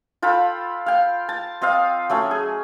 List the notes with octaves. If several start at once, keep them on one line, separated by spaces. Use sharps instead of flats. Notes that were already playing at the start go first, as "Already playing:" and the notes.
F4 A4 G5 B5
F5 G5
A5
C4 C5 D#5 F5
F#3 A3 C#4
G#4